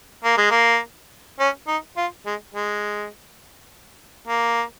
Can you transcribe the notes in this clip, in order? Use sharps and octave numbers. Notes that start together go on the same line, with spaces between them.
A#3
G#3
A#3
C#4
D#4
F4
G#3
G#3
A#3